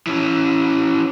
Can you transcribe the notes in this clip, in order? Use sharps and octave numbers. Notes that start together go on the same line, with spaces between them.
E3 C#4